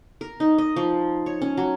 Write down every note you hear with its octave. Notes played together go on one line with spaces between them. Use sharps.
A#4
D#4
D#5
F3
C#5
C#4
F#3